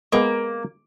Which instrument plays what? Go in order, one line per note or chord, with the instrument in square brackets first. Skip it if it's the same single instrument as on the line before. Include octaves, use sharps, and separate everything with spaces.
[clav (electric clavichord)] G#3 B3 D#5 [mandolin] A#3